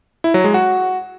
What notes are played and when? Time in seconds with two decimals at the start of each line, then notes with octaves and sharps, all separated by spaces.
0.24 E4
0.34 F#3
0.44 G#3
0.54 F#4